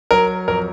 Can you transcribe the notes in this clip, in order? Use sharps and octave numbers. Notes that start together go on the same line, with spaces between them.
F#3 A#4
F2 A#4